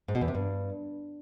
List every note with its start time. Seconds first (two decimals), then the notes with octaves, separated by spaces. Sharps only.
0.08 G#2
0.15 B2
0.21 E2
0.28 C3
0.35 G2